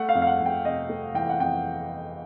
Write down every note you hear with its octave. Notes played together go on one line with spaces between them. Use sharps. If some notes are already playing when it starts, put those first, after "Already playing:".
Already playing: A3 F#5
F5
F2
F5
F#5
F2
G5
C3 D#5
A3
E3 G5
F#5
F2 G5